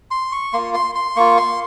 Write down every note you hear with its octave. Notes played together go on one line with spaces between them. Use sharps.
C6
C#6
A#3 F4 C6
C6
C6
A#3 F4 C#6
C6